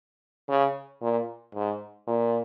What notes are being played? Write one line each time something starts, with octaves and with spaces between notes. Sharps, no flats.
C#3
A#2
G#2
A#2